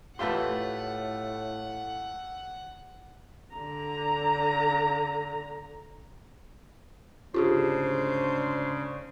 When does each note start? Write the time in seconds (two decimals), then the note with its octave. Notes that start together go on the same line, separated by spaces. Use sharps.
0.19 A2 A3 F4 G4 B4 E5 F#5 C6
3.55 D3 A#5
7.34 D2 G#2 C#3 D4 F4 G4 G#4 C5